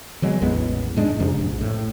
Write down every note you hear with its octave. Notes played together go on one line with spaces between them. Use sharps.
D#3 F#3 G#3 B3
A1 E2 G#3 B3
G#2 G#3 D4
F2 C3 F3 D4
A#1
A2